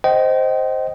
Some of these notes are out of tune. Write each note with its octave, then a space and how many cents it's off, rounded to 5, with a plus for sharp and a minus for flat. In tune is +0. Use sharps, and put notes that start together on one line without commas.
C5 +0 D#5 +0 G5 -30